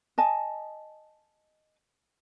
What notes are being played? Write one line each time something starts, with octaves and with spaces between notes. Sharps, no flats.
D#5 G#5 A5